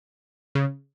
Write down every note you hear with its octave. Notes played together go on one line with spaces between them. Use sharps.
C#3